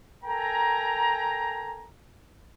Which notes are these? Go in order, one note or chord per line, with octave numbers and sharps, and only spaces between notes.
A4 A#4 G5 G#5 A#5